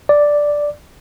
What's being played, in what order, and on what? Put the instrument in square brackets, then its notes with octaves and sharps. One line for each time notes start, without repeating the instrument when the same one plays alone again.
[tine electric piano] D5